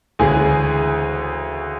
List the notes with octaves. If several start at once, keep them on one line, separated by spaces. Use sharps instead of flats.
D2 C#3 E3 G#3 G#4 G#5